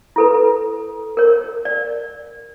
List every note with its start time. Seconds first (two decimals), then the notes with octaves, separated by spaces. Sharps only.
0.16 E4 A4 B4
1.17 A#4 C#5
1.65 D5